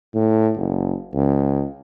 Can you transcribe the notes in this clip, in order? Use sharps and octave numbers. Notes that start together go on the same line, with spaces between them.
A2
F#1
C#2